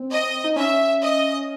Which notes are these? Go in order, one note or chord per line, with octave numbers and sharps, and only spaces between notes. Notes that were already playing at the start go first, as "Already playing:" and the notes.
Already playing: C4
D#5
D#4
C#4 E5
D#5